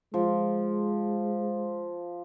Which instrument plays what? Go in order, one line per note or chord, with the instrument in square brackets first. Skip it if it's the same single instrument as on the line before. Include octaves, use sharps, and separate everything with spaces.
[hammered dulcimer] F3 [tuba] G#3